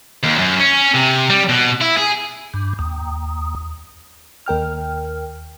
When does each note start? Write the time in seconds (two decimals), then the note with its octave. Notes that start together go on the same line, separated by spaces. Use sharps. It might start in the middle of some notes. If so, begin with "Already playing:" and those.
0.24 D#2
0.39 F#2
0.60 C#4
0.94 C3
1.30 G3
1.49 B2
1.81 E4
1.98 G#4
2.54 G2
2.79 D#2
4.46 D#2 A#4 G5 F6